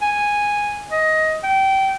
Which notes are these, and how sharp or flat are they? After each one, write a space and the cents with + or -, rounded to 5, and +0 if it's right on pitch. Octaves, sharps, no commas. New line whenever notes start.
G#5 -10
D#5 +15
G5 -20